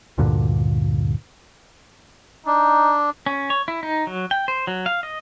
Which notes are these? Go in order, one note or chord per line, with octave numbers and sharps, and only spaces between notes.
D2 G2 A#2 D3
D4 D#4
C#4
C#5
E4
D#4
F#3
G5
C5
F#3
F5
D#5